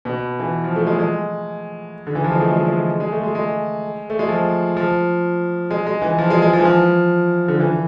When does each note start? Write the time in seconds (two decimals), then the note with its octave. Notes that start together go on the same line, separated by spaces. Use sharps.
0.05 B2
0.39 E3
0.64 F3
0.76 A3
0.87 G#3
0.99 G#3
2.07 D3
2.15 E3
2.24 F3
2.31 G#3
2.41 A3
2.52 G#3
2.65 G#3
3.00 G#3
3.12 A3
3.23 G#3
3.35 G#3
4.10 A3
4.19 G#3
4.29 F3
4.77 F3
5.71 G#3
5.87 G#3
6.02 E3
6.19 F3
6.30 G#3
6.42 G#3
6.53 F3
6.59 E3
6.65 F3
7.48 D3
7.60 E3